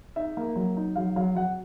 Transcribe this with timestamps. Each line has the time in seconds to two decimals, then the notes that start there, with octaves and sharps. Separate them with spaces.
0.16 D#4 E5
0.37 A#3
0.56 F#3
0.77 D#4
0.96 F#3 F5
1.16 F#3 F5
1.35 F#3 F#5